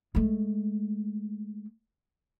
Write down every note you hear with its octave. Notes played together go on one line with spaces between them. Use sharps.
G#3 A3